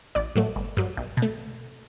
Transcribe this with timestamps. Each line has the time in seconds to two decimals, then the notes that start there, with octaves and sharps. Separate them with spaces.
0.15 A1 D5
0.36 A2 F#3 A3
0.56 G1
0.77 G2 F#3
0.97 B1
1.17 B2
1.22 A3